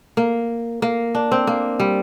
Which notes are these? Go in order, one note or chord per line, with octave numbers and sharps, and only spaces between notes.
A#3
A#3
D4
C4
A#3
G3